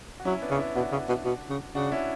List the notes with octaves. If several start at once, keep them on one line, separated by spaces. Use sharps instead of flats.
F#4
F#3 C#4 E4
B3 D4
C#3
C#4 E4
B2 D4 F#4
C#3
B2
B2
C#3
C#3 D4 F#4
C#4 E4